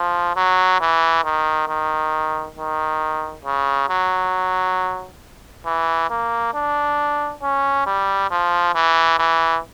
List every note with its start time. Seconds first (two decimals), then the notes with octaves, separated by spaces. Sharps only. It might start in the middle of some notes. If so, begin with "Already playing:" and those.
Already playing: F3
0.36 F#3
0.81 E3
1.24 D#3
1.69 D#3
2.57 D#3
3.45 C#3
3.89 F#3
5.66 E3
6.10 A#3
6.54 D4
7.43 C#4
7.86 G3
8.31 F3
8.75 E3
9.19 E3